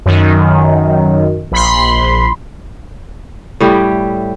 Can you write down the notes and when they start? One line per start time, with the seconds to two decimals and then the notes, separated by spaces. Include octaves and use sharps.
0.06 F#2 D#3
1.52 A#1 B5 C6
3.60 A2 G3 E4 G4